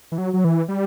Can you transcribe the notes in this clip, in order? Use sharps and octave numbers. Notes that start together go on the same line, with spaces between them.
E3
F#3
F#3
E3
G3